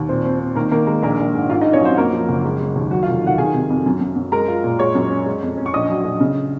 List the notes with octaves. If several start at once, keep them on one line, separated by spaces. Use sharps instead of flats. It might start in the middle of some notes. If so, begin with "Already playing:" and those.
Already playing: D#2
A#2 C4 C5
C4
C4
D#3 A#3 A#4
D#3 A#3 A#4
G#3 A#3 A#4
A#1 A#3 A#4
A#1
G#2
G#2 F4 F5
D#4 D#5
F4
C#4 C#5
F#3 C4 C5
F#2 A#3 A#4
F3
F#1
G#3
G#3
D#2
F#3 F#4
F4 F5
F1
D#3 F#4 F#5
D#3 G#4 G#5
C3
F2
F#2
F#2
F#2
G#3 A#4 A#5
F4
A#2
G#3 C#5 C#6
F#2
C#4
G#3
F2
C#4
C#6
A#1 D#5 D#6
F#3
A#1
C#3